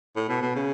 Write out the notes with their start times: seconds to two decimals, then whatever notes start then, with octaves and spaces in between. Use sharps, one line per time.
0.16 A2
0.29 B2
0.42 B2
0.56 C#3